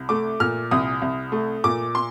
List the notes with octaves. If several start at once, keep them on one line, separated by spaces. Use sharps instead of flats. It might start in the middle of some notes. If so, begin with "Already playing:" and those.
Already playing: C2
A3 D6
A#2 F6
C2 D#6
C2
A3
A#2 D6
C6